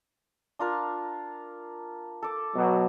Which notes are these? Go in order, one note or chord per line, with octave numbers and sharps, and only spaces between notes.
D4 F4 A#4
A4 D6
B2 F#3